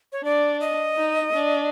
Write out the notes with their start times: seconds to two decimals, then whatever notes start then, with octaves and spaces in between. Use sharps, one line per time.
0.12 C#5
0.24 D4 D5
0.61 D#5
0.97 D#4
1.33 D4